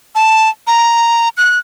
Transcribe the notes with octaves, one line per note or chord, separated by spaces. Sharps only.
A5
A#5
F#6